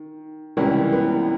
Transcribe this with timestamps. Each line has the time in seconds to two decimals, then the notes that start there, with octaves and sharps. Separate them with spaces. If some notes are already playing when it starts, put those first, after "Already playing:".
Already playing: D#3
0.57 C#2 C3 E3 G3 C#4
0.93 B3